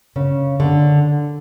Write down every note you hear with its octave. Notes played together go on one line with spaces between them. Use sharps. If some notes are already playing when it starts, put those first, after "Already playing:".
C#3
D3